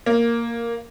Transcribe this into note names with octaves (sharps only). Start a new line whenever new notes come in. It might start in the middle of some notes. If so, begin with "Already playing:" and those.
A#3